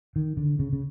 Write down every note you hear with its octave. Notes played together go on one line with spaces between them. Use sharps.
D#3
D3
C#3
C#3